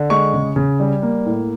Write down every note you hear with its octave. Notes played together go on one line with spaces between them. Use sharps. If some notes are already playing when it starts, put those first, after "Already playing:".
Already playing: D3
G#3 C#6
C#3
C#3
G3
A#3
A2